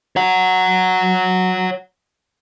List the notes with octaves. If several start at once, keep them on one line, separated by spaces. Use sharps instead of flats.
C#5 F#5